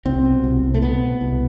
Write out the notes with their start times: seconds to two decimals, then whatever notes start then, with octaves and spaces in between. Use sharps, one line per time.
0.05 C2 C4
0.25 B2
0.44 C2
0.63 C2
0.74 A3
0.82 B2 B3
1.02 B2
1.21 C2